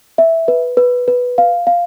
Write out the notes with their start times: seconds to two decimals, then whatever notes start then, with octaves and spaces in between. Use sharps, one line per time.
0.18 E5
0.48 B4
0.77 B4
1.08 B4
1.38 F5
1.67 F5